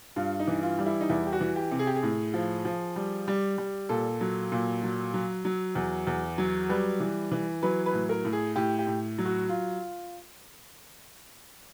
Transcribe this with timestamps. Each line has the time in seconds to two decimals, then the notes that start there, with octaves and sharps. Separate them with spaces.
0.16 G2 F4
0.40 D#4
0.47 E3
0.63 F4
0.79 G3
0.86 E4
1.01 D#4
1.10 E2 E4
1.27 G4
1.32 F#4
1.41 E3
1.56 G4
1.71 C3
1.79 G#4
1.87 G4
1.95 G#4
2.03 A2
2.34 F3
2.65 F3
2.96 G3
3.28 G3
3.58 G3
3.89 A#2 A4
4.21 F#3
4.52 A#2
4.83 F#3
5.14 F#3
5.45 F#3
5.75 E2
6.07 E2
6.38 F#3
6.69 G3 B4
7.00 E3
7.32 E3
7.63 F#3 B4
7.86 B4
7.93 A2
8.09 A#4
8.25 A2
8.33 G#4
8.56 A2 G4
8.79 G4
8.87 A2
9.18 F#3
9.25 F#4
9.49 F4